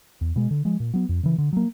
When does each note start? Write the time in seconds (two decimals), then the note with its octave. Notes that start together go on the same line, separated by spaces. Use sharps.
0.21 E2
0.36 B2 G#3
0.51 D3
0.65 F3 G#3
0.80 A#2
0.94 F#3 B3
1.09 F2
1.23 C#3 E3
1.38 D3
1.53 F#3 A#3